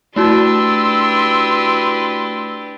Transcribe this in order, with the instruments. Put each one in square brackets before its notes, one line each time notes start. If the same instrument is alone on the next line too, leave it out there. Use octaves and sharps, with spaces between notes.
[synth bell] A3 E4 F#4 [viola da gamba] D4 G4 B4 [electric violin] C6 E6